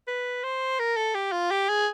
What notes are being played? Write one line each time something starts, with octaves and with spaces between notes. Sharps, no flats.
B4
C5
A#4
A4
G4
F4
G4
G#4